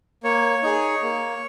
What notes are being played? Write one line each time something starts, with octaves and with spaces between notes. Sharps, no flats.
A#3 C#5
D#4 G#4
A#3